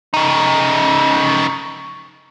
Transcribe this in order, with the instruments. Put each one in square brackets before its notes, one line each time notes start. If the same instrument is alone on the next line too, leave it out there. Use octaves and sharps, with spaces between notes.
[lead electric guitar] C#3 D#4